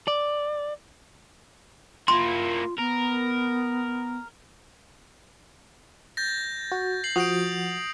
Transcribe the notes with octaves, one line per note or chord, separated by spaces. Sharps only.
D5
A#3 E4 F4 C6
B3 A#4
G6 A6 A#6
F#4
C7 F#7
F3 F#4 D#6 G6 D7